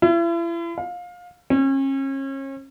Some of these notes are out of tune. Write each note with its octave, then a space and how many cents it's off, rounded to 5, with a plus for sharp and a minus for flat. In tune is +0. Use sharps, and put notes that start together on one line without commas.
E4 +40
F5 +25
C#4 -35